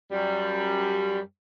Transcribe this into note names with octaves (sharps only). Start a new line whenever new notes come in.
F#2 G3